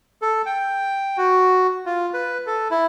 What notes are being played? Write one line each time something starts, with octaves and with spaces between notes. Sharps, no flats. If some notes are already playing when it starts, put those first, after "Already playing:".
A4
G5
F#4
F4
B4
A4
E4